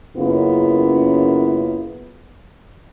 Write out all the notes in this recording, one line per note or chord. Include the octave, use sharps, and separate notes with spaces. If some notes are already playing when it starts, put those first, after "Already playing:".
F#2 C#3 A#3 B3 E4 F4